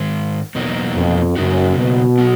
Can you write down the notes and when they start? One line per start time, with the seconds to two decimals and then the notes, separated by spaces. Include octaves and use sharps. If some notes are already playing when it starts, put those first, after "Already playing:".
Already playing: G#2 D#3 G#3
0.55 E2 B2 F#3 A#3 D#4
0.95 F2
1.36 F#2 C#3 F#3 A#3 D#4 F#4
1.77 B2
2.18 F#3 B3